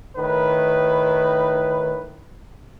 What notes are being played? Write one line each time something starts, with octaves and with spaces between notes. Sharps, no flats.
A2 D#3 B4